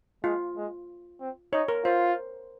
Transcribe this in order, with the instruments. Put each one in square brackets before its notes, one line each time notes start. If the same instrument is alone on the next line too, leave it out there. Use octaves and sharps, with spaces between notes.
[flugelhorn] G#3 [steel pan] F4
[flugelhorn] G#3
C4
[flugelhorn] D#4 [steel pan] C#5
[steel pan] A#4
[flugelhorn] F4 [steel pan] C5